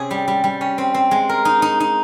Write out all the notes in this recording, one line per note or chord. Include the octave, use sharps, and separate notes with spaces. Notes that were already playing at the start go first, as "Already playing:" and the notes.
Already playing: C3 C#4 G#4
G3
G3
G3
C#4
C4
C4
G#3
A#4
D#4
D#4
D#4